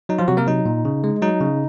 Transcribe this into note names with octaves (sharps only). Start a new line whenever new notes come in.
F#3 D#4
F3 F4
C3 F#3 F#4
A#3 A#4
F#3 D#4
A#2
C#3
G#3
F#3 D#4
C#3